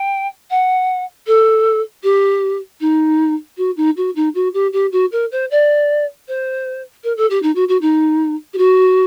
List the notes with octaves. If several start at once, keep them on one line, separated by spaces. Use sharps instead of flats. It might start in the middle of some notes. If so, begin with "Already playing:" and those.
Already playing: G5
F#5
A4
G4
D#4
F#4
D#4
F#4
D#4
F#4
G4
G4
F#4
A#4
C5
D5
C5
A#4
A4
G4
D#4
F#4
F#4
D#4
G4
F#4